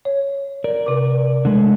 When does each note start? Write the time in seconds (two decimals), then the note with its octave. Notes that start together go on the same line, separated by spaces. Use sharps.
0.05 C#5
0.64 A#4 D5
0.86 C3 D6
1.45 D3 G#3 A3